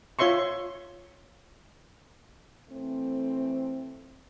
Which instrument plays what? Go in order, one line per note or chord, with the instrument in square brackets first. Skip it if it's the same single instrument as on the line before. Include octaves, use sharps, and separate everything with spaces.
[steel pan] F4 C#5 E5 C6 C#6
[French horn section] E3 A3 C4